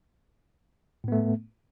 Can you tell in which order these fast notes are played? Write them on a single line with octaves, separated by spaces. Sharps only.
A2 B3 A3